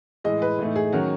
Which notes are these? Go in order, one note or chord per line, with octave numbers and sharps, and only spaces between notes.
A2 E3 G#3 D#5
B4
A2 E3 A3 D#4
G#4
D#3 F#3 C#4 F#4